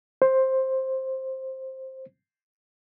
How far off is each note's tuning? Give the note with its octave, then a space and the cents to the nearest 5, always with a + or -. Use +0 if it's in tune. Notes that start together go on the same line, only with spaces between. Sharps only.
C5 +10